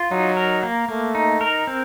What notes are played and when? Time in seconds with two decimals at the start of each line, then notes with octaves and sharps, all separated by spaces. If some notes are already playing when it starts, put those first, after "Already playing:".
Already playing: F4
0.11 F#3 D#4
0.37 A#4
0.63 A#3
0.88 A3 A#3
1.15 D#4
1.41 A#4
1.67 C4